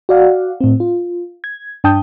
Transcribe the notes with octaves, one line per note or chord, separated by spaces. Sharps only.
F#4 D5 F5 F#5
A2 C4
F4
G#6
G2 D4 G5 A5 D#6 G6